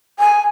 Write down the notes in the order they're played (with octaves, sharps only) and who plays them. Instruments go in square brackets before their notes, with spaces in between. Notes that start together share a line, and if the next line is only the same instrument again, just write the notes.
[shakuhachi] G#5